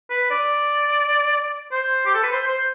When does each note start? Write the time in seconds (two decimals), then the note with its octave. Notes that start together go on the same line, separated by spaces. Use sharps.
0.10 B4
0.31 D5
1.72 C5
2.06 G4
2.14 A4
2.23 B4
2.33 C5
2.47 C5